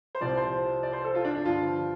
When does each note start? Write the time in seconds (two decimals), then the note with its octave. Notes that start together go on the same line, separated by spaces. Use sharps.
0.15 C5
0.21 C2 C3 F3 D5
0.37 C5
0.83 D5
0.93 C5
1.04 A4
1.15 F4
1.25 D4
1.35 D4
1.45 G2 D3 F3 F4